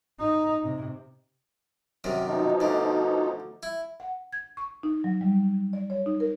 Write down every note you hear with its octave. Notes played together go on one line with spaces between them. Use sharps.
D#4
C3
F#2 C3 D#3
B2 F3 D#4
D2 D3
E4
F#5
G#6
C#6
D#4
F#3
G3
D5
C#5
D#4
A#4